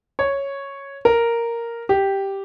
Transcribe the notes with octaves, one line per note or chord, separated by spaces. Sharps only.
C#5
A#4
G4